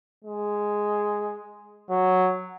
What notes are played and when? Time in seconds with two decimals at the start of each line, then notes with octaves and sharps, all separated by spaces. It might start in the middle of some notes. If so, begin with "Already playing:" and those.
0.24 G#3
1.90 F#3